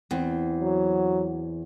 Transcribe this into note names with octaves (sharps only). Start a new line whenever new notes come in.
E2 C4
F#3